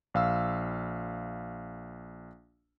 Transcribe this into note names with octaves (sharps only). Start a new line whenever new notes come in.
A#1 F5 E6